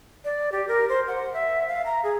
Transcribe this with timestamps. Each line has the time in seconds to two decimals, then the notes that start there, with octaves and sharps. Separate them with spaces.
0.25 D5
0.52 G4
0.68 A#4
0.89 C5
1.08 F#5
1.34 E5
1.68 F5
1.86 A#5
2.04 G#4